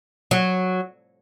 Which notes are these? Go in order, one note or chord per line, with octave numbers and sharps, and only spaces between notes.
F#3